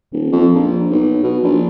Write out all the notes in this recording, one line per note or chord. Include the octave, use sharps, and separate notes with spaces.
D#1
F2
A#1
B1
B2
A#1